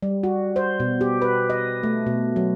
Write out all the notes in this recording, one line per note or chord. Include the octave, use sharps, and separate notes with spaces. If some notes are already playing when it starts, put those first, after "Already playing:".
G3
F#4
C5
B2
G4
B4
D#5
A3
B2
F#3